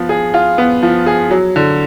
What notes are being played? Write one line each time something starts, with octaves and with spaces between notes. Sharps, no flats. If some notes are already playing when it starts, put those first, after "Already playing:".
Already playing: F3 B3
G#4
F4
B3
F3
G#4
F#3
D3